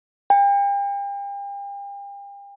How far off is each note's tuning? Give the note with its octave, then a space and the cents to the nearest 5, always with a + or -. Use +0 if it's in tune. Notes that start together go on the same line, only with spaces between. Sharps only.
G5 +40